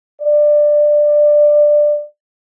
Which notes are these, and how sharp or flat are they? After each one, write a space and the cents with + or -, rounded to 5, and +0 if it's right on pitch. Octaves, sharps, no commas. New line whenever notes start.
D5 +15